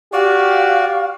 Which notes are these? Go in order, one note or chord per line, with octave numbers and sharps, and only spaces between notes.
F#4 G4 D5 F5